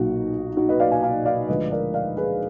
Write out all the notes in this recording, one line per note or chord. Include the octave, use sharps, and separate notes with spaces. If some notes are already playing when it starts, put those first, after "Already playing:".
Already playing: B1 A#2 F#3 D#4 F#4
D#4 F#4
B4 D#5
D5 F5
F5 G#5
F5 G#5
D5 F5
D2 D3 F3 G#3 B4 D#5
A#4 D5
D5 F5
G#4 B4